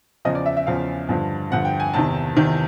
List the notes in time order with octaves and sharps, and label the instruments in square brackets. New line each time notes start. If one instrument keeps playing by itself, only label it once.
[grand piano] E2 C#3 F3 D#5
D5
E5
E5
E2 C#3 F3 F5
G2 D3 F3
G2 D3 F3 F#5
G5
G#5
E2 C3 D#3 A5
E2 C3 D#3